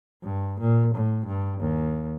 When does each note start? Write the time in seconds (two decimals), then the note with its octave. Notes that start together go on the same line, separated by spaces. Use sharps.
0.24 G2
0.61 A#2
0.95 A2
1.26 G2
1.61 D#2